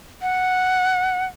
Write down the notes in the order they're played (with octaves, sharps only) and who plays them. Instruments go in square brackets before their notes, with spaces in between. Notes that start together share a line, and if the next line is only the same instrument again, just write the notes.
[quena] F#5